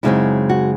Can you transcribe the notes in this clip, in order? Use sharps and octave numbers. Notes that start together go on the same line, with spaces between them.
F#2 C#3 G#3 C4 D#4 E4
F#4